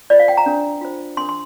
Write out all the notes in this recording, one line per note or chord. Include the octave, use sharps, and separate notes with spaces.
F4 C5 D5
F5
G5
A#5
D4 A#4
F4 C5
D4 A#4 C6
C6